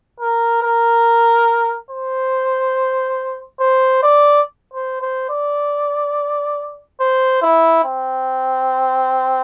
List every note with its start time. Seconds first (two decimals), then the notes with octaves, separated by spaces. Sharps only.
0.20 A#4
0.63 A#4
1.90 C5
3.60 C5
4.03 D5
4.74 C5
5.02 C5
5.30 D5
7.00 C5
7.42 E4
7.84 C4